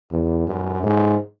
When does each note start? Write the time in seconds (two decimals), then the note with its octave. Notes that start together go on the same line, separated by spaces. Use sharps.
0.11 E2
0.47 F#2
0.83 G#2